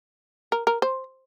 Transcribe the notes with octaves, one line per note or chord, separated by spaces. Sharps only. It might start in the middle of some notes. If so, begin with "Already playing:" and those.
A#4
A#4
C5